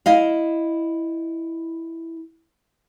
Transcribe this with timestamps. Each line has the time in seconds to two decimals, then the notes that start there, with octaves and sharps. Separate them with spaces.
0.06 E4 D#5 F5